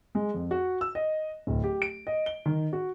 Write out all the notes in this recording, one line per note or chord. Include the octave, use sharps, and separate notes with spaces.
G#3
F2
F#4
E6
D#5
D1
G4
D7
D#5
G7
D#3
F#4